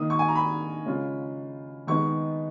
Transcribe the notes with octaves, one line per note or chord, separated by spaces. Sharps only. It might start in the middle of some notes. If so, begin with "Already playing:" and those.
Already playing: D#3 A#3 D#4 D#6
C#6
G#5
A#5
B5
C#3 G#3 C#4 F4
D#3 G#3 B3 D#4 C#6